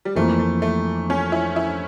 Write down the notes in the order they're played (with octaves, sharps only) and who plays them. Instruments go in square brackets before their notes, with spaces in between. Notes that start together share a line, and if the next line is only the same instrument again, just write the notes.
[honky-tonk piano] G3
[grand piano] F2 E3 A#3 [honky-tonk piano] A3
[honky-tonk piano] A3
A3
C#4
E4
E4